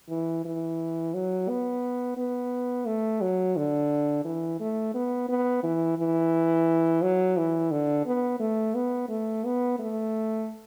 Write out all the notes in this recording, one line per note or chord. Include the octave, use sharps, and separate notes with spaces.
E3
E3
F#3
B3
B3
A3
F#3
D3
E3
A3
B3
B3
E3
E3
F#3
E3
D3
B3
A3
B3
A3
B3
A3